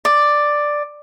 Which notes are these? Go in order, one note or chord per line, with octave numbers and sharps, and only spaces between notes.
D5